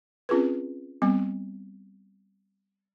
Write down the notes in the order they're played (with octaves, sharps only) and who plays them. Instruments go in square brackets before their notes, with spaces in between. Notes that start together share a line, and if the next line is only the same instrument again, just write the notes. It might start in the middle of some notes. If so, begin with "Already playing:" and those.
[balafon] C4 C#4 F4 G#4 B4
G3 B3 C4